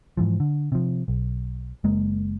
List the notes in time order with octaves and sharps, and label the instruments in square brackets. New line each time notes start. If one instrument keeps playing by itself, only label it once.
[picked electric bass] G#2 E3 F3
D3
C3 F3
B1
F#1 G#3 A#3